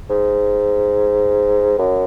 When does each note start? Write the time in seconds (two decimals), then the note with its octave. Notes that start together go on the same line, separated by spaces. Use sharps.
0.10 G#2
1.78 F#2